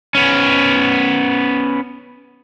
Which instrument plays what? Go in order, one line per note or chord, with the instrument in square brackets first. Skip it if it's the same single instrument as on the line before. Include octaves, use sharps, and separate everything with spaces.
[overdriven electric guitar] B3 C#4